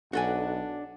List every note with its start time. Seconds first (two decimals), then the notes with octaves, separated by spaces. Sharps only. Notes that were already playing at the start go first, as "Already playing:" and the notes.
0.13 B1 D4 F#4 A4 F#5 G#5